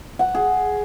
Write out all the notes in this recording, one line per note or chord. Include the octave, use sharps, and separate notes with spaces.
F#5
G#4